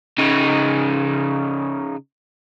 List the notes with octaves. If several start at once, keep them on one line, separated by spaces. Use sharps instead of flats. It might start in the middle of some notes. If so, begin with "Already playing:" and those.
C#3 D#4